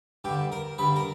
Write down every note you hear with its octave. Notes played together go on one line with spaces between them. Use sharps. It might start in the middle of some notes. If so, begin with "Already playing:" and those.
G2 D3 G4
A#4
G2 D3 B4
A#4